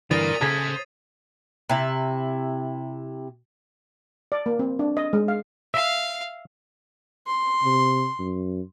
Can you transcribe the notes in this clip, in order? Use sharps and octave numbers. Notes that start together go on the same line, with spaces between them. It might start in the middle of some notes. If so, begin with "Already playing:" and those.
G2 D3 E3 A#4 D5 D#6 A6 D#7
C#3 G#4 A4 C5 A#5 G#6 A6 B6
C3 E4
D5
A#3
C4
D4
D#5
G#3
F5
E5 F5
C6
C3
F#2